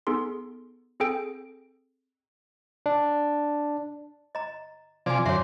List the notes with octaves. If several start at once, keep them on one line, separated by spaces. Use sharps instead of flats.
B3 D#4 G#4 A4 C6
C4 G#4 A4 G5 D7
D4
D#5 A#5
C3 F3 D5 G#5 D6
F#2 D3 C#5 E5 C6